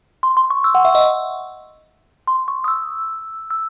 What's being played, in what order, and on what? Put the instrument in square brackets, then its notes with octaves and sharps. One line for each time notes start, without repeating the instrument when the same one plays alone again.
[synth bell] C6
C6
C#6
E6
F#5
E5
D#5
C6
C#6
D#6
E6
E6